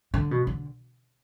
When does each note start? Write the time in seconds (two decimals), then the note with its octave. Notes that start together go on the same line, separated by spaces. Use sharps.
0.14 D3
0.31 B2
0.47 D3